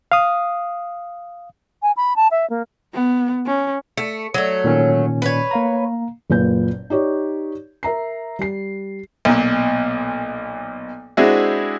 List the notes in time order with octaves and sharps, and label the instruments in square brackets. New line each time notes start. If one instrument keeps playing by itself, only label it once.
[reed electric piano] F5 D#6
[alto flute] G#5
B5
A5
E5
A#3
[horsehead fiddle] B3
C#4
[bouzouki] A3 [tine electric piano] C#7
[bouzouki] F#3 A3
[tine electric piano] A#2 D#3 C#4
[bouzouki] B4 C#5
[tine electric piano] A#3 F5 A#5
[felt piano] F#1 A#2 B4 G6
D#4 G4 C#5 D5
A#4 E5 A#5 C7
G3 C7
[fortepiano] B1 A#2
G#3 C4 D4 E4 F#4 G#4